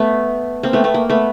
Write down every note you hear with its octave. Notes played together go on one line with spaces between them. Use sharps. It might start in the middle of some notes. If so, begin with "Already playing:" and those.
Already playing: A3 B3
A#3 C4
A3 B3
A3 B3
A#3
A3 B3